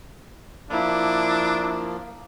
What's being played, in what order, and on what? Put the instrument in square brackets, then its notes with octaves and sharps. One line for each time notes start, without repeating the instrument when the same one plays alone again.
[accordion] F3 A#3 [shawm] D4 [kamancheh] E4